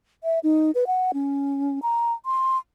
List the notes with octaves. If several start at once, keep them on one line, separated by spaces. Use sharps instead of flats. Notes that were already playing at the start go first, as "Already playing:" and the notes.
E5
D#4
B4
F#5
C#4
A#5
C6